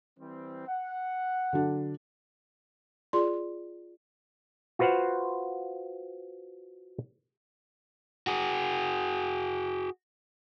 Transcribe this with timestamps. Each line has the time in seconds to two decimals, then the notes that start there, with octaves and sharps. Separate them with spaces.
0.19 E3 G3 C4
0.68 F#5
1.53 D3 F#3 D4
3.13 F4 G#4 D5 C6
4.79 F4 F#4 B4 C5 F5 F#5
8.27 F#4 G#4